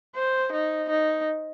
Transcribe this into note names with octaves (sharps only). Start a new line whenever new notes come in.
C5
D#4
D#4